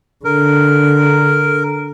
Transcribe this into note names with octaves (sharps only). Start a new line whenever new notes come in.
D3 A#4